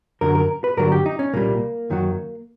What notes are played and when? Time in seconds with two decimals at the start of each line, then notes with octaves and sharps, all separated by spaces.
0.21 F#2 D3 F#3 A#4
0.35 A#4
0.64 B4
0.77 G2 D3 F#3 A#4
0.92 G4
1.06 D#4
1.19 C#4
1.33 C2 A#2 G3 A#3
1.90 F#2 D#3 F#3